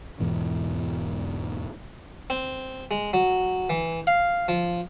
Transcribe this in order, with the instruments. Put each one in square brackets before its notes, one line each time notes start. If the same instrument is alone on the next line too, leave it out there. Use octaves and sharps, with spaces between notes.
[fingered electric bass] E2 G#2 B2 E3
[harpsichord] C4
G#3
F#3
E3
F5
F3